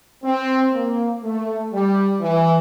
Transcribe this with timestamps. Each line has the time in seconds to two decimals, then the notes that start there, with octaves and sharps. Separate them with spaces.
0.24 C4
0.72 A#3
1.23 A3
1.72 G3
2.21 E3